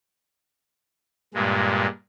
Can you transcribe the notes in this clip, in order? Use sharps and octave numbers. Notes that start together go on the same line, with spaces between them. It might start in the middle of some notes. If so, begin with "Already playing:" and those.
G2 A#2 G#3